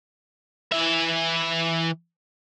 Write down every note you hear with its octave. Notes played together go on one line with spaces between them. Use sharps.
E3 E5